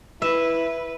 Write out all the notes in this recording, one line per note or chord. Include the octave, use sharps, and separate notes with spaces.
E4 B4 E5